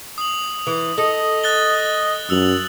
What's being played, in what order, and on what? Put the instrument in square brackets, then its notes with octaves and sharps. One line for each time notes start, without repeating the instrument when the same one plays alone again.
[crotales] D#6 F#7
[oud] E3
[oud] A4 [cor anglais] D#5
[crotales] F#6 A6 G7
[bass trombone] F#2 [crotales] E6 F7 F#7